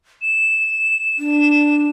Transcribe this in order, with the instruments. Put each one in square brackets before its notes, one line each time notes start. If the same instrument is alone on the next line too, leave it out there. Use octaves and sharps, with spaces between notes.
[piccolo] E7
[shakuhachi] D4